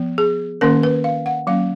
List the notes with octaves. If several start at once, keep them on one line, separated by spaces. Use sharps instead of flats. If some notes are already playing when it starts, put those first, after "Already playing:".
Already playing: F3 B3
G#4
D#3 A#3 C#4 A#4
B4
F5
F#5
F#3 A#3 C#4 F5